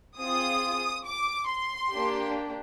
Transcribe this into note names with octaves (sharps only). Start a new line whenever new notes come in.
C4 F4 G#4 D#6
D6
C6
A#3 D4 G4